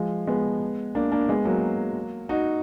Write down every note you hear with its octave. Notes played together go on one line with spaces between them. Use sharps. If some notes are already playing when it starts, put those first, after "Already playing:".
Already playing: F3 G#3
G#3 B3
A#3 D4
A#3 D4
G#3 B3
F#3 A#3
D#4 F#4